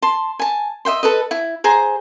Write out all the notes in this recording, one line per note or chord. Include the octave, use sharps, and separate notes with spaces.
A5 C6
G#5 A5
D#5 E5 G5 C6
A4 B4 D#5
E4
G#4 C5 A#5